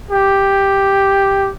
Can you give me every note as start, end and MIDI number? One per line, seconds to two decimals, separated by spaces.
0.11 1.50 67